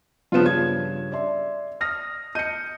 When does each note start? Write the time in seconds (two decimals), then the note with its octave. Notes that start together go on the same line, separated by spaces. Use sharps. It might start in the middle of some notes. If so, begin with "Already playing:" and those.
0.32 G2 C#3 F3 B3 F4 E7
0.46 G#6
1.12 D5 E5 C6
1.81 D#6 F6 A#6
2.35 D#5 G6 C#7 D#7